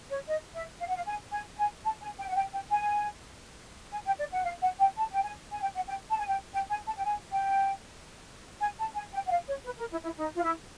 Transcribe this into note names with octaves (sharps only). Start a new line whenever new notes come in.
C#5
D#5
E5
F5
F#5
F5
G#5
G#5
G#5
A5
G#5
G5
F#5
G5
G5
G#5
G#5
G5
D5
F#5
F5
F#5
G5
A5
G5
G#5
G#5
G5
F#5
G5
A5
G#5
G5
G5
G#5
A5
G5
G#5
G5
G#5
A5
G#5
G5
F#5
F5
C#5
B4
A#4
E4
E4
D#4
F4
E4